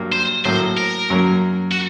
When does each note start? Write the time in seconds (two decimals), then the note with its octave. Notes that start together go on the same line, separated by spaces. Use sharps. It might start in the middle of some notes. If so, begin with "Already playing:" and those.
Already playing: G2 F#3 A#3
0.12 C5
0.45 A2 F#3 A#3 C5
0.77 A#4
1.10 F#2 F#3 A#3
1.71 F#4